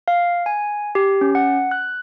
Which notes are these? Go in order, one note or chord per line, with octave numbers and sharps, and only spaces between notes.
F5
G#5
G4
C#4
F#5
F#6